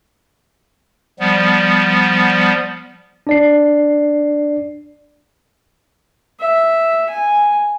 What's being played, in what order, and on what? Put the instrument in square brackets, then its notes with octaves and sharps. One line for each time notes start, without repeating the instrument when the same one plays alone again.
[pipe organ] F3 G3 B3
[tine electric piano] D4 D5 C7
[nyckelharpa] E5
G#5